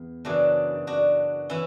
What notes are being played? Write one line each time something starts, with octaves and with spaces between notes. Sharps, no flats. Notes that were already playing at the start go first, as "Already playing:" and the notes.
Already playing: E2
F#2 C#3 E3 D4 F#4
D4 F#4
E3 C#4 E4